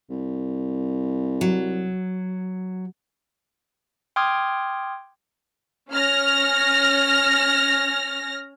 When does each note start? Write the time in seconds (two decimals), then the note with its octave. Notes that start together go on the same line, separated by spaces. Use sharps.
0.10 C2
1.41 F#3
4.16 G5 C6 D6 D#6 F6 G#6
5.91 C#4 F6 A#6